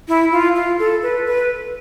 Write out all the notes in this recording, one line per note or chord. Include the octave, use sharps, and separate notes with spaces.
E4
F4
F4
A4
B4
B4